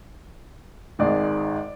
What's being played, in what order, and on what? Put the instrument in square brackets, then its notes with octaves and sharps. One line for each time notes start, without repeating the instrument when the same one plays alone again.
[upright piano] G#1 G#2 G#3 D5